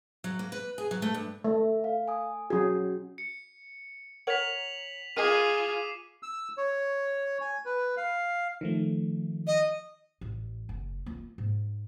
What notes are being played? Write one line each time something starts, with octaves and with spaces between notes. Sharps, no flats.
F#3
A#3
B4
G#4
F#3
A3
G2
A3 E5
F5
G#5 D#6
F#3 C#4 F#4 G#4
C#7
A#4 C#5 F#5 B6 F7 F#7
F4 G#4 A#4 D#5 G#5 D6 C7 D#7
E6
C#5
G#5
B4
F5
D#3 F3 A3
D#5
A1
F#1
A#3 F4
G#2